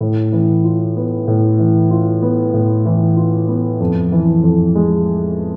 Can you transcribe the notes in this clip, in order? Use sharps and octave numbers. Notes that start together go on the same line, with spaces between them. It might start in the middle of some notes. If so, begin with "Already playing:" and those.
A2
E3
F4
B3
A2
E3
F4
B3
A2
E3
F4
B3
F2
E3
F2
G#3